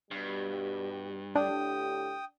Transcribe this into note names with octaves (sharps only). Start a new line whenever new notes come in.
G2 B2 G3 G4
A2 D3 D4 G4 G5 D#6